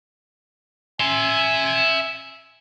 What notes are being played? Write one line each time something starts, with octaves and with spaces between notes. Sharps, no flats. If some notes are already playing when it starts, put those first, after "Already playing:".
E5 G#5 C6